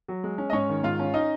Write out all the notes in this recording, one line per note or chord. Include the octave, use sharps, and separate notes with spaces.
F#3
G#3
C#4
D#5
G#2 C#4 C#5
D#3
G#2 F4 F5
C#4
D#4 D#5